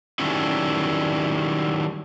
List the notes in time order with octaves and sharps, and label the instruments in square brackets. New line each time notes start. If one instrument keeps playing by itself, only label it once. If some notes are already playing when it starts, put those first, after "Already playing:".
[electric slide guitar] D#3 F#3 G3 A3 C#4 E4